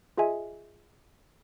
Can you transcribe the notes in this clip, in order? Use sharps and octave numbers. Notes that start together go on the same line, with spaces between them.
F4 G#4 D#5 E5 G#5